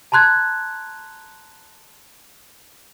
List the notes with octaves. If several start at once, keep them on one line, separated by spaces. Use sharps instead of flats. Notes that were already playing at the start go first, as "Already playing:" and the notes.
A5 A#5 C6 F#6 G#6